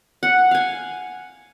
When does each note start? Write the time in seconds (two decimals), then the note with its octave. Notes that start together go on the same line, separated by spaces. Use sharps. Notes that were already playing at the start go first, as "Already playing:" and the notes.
0.23 F#5
0.51 F5 G#5